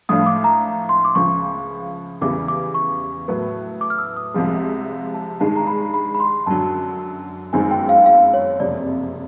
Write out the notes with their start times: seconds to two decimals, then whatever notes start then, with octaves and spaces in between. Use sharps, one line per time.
0.09 A2 F3 A3 D4 F4 D#6
0.26 D6
0.44 A#5
0.89 C6
1.05 D6
1.15 C#2 C#3 F3 C#6
2.21 E2 C#3 E3 G3 D6
2.48 D6
2.74 C#6
3.28 A2 F#3 B3
3.81 D6
3.90 F6
3.98 E6
4.17 D#6
4.34 C2 C3 F3 G#3
5.14 A5
5.40 G2 D#3 G#3 A5
5.56 A#5
5.67 B5
5.94 B5
6.15 B5
6.20 C6
6.46 F#2 D3 F#3 A5
7.53 G1 F#2 D#3 G#3 C4 G#5
7.71 G5
7.89 F5
8.06 F5
8.34 C#5
8.60 F#1 F2 C3 D5